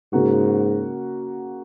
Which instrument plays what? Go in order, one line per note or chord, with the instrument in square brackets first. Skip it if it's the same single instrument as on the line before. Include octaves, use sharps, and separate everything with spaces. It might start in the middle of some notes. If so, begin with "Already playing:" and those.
[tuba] G#2 [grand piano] C#3 A#3 F#4